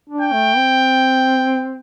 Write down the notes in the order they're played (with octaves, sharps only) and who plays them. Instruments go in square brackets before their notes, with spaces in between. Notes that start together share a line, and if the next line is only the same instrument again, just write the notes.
[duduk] D4
[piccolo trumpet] G5
[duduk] A3
C4